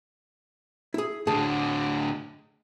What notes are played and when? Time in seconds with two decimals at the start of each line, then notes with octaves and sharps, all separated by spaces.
0.94 E4 G#4
1.27 A2 D3 G#4 A5